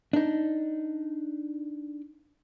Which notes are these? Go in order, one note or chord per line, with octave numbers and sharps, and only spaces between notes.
D4 D#4